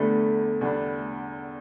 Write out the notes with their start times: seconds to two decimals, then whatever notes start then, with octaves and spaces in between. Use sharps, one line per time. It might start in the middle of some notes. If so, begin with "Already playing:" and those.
Already playing: E2 D3 G3 A3 B3 D4
0.61 E2 D3 G3 B3 D4